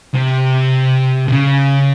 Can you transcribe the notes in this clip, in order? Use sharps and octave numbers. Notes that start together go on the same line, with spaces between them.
C3
C3
C#3